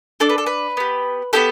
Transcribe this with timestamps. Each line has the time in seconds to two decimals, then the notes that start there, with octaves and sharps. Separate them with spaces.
0.20 D4 A4 D5
0.29 B4
0.38 A4
0.46 B4
0.77 B3 G4
1.33 B3 E4 G4 A4